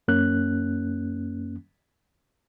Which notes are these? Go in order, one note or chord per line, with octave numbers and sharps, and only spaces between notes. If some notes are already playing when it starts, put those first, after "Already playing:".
F#2 A#3 C#4 F#6